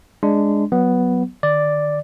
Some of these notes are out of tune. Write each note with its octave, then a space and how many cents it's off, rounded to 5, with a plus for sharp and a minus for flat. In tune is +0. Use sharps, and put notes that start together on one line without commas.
G#3 +0 D4 +0 C6 -25
F#3 +0 B3 +0
D#3 -45 D5 +0